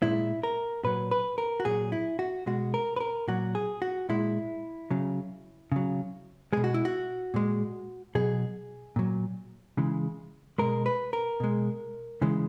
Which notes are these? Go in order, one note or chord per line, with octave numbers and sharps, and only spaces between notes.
A#2 G#3 E4
A#4
A#2 F#3 B4
B4
A#4
F#4
A#2 F#3 G#4
E4
F#4
B2 G#3 F#4
A#4
B4
A#4
A#2 F#3 F#4
G#4
F#4
A#2 G#3 E4
C#3 F#3
C#3 F#3
B2 G#3 G#4
F#4
E4
F#4
A#2 G#3
B2 F#3 G#4
A#2 F#3
C#3 E3 G#3
B2 G#3 A#4
B4
A#4
B2 G#3
C#3 E3 G#3